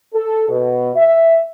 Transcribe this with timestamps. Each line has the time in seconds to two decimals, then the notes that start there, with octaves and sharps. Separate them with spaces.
0.14 A4
0.49 B2
0.96 E5